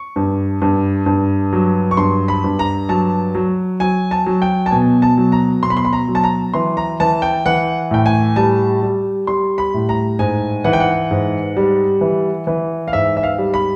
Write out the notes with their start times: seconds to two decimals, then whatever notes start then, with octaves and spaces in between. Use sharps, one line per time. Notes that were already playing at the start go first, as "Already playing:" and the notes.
Already playing: C#6
0.16 G2
0.62 G2
1.06 G2
1.53 F#3
1.91 C#6
1.97 G2 C6
2.28 B5
2.44 G2
2.59 A#5
2.89 F#3 A5
3.35 F#3
3.80 F#3 G#5
4.11 A5
4.26 F#3
4.42 G5
4.66 A5
4.71 B2 G#5
5.02 A5
5.17 F#3
5.32 A#5
5.63 B2 C6
5.70 B5
5.77 C6
5.85 B5
5.93 A#5
6.08 F#3
6.15 A5
6.24 A#5
6.54 E3 C6
6.77 A#5
7.00 E3 A5
7.22 G5
7.46 E3 F#5
7.91 A2 G5
8.06 G#5
8.36 G3 A5
8.82 G3
9.27 G3 C6
9.58 B5
9.74 A2
9.89 A#5
10.19 G#2 G#5
10.64 E3 F#5
10.73 G5
10.80 F#5
11.11 G#2
11.57 G3
12.01 E3
12.47 E3
12.88 F5
12.93 G#2 E5
13.17 E5
13.23 F5
13.38 G3
13.54 B5